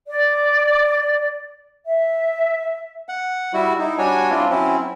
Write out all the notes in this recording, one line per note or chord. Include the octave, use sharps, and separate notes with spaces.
D5
E5
F#5
G3 E4 F#4
D#4 E4
G3 D4 F#4 C#5 G#5
C4 D4 E4 F4
F#3 C4 C#4 E4